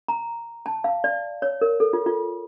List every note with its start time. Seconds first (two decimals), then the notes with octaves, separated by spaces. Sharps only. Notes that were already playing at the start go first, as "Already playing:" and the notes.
0.08 A#5
0.66 A5
0.84 F5
1.04 D5
1.42 C#5
1.61 A#4
1.80 A4
1.93 F4
2.06 F4